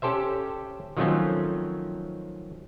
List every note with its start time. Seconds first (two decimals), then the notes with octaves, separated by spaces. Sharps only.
0.02 C#4 G4 A4 C5 E5
0.97 D#3 F3 F#3 A3 C4 C#4